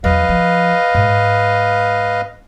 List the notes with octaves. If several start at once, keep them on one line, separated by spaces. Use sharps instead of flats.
E2 F#3 B4 D#5 F5
F3
G#2